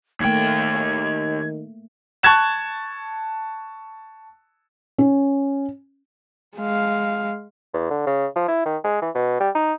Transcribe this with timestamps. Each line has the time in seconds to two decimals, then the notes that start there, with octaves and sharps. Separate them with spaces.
0.20 D#2 D#3 A3 A#3 G5 G#6
2.23 A5 C#6 F#6 G#6 A6 E7
4.98 C#4
6.57 G#3 F5
7.74 E2
7.91 D3
8.07 C#3
8.36 F3
8.48 E4
8.66 D#3
8.84 G#3
9.02 E3
9.15 B2
9.40 G3
9.55 D#4